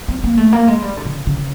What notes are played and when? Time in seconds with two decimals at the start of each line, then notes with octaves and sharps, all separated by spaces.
0.08 C4
0.24 A#3
0.37 A3
0.52 A#3
0.67 G#3
0.82 G3
0.97 D3
1.04 C#3
1.27 C#3